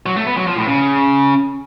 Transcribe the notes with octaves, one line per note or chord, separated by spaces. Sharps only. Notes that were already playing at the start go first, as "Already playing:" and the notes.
F#3
A3
B3
F#3
F3
A2
C#3